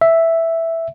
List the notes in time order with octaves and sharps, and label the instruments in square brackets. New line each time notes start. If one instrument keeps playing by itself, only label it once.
[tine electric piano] E5